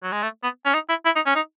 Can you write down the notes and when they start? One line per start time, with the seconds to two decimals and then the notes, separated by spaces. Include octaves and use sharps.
0.03 F#3
0.12 G#3
0.23 A3
0.43 B3
0.66 C#4
0.74 D#4
0.89 E4
1.05 E4
1.16 D#4
1.26 C#4
1.36 D#4